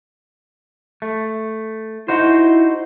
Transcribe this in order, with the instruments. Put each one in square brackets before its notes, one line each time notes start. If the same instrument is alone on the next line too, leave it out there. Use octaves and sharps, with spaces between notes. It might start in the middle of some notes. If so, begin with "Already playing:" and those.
[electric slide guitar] A3
[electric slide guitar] D#4 F#4 C5 [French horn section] E4